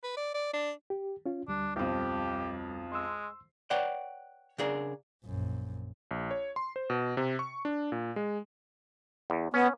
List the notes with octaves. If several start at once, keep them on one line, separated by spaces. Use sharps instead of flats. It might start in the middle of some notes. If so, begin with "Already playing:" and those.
B4
D5
D5
D4
G4
C#4 F4
D2 G3 D4
B1 F2 G4
G#3 C6 E6
B4 C#5 D5 F#5 G5
C#3 D4 G#4 A#4
A#1 F#2
A#1
C#5
C6
C5
B2
C3
C#6
D4
A#2
G#3
E2
B3 C#4